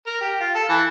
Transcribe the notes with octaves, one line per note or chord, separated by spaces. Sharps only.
A#4
G4
F4
A4
E3